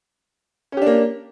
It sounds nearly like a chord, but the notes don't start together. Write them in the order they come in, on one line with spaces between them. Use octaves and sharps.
C#4 G4 D4 A#3